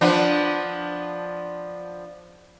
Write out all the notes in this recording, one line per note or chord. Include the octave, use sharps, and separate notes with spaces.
F3 B3 D4